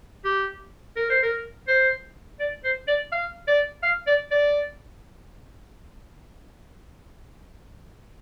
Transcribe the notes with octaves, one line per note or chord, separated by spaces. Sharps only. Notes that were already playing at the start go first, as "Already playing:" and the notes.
G4
A#4
C5
A#4
C5
D5
C5
D5
F5
D5
F5
D5
D5